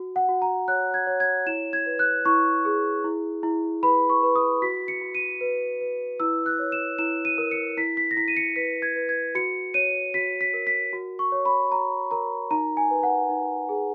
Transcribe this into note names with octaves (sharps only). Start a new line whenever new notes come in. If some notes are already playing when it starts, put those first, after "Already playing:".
Already playing: F#4
F#5
F#4
A#5
C#5 F#6
G#6
C#5
G#6
E4 E7
G#6
B4
F#6
E4 C#6
G#4
E4
E4
B4 B5
C#6
B4
D#6
F#4 B6
C#7
F#4
D#7
B4
B4
E4 E6
F#6
C#5
E7
E4 E7
D#7
A#4
C#7
E4 B6
B6
A#6
E4 B6
D#7
C#7
B4 B6
G#6
B4
G#6
F#4 C#7
C#5 D#7
F#4 B6
B6
A#4
B6
F#4
C#6
C#5
B5
F#4 A#5
A#4 A#5
D#4 A#5
G#5
B4
F#5
D#4
G#4